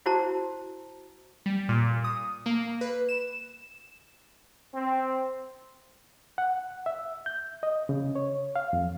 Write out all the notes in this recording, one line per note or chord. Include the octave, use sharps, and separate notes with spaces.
E4 F#4 C5 A5 A#5
G3
A#2
D#6
A#3
B4
E7
C4
F#5
E5
G6
D#5
C#3
C#5
F5
F2